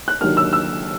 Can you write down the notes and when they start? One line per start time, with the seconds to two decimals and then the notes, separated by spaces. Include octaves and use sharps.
0.08 F#6
0.20 D#2 D3 F#3 A#3 D4 F6
0.37 E6
0.53 E6